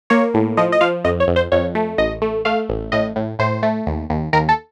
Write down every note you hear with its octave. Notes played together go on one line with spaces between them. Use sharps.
A#3 C#5
A2
F3 D#5
D#5
F3 F5
F2 D#5
C#5
F2
C5
F2 C#5
A3
A1 D#5
A3
A3 F5
A1
A2 D#5
A2
A2 C5
A3
D#2
D#2
D#2 A#4
A4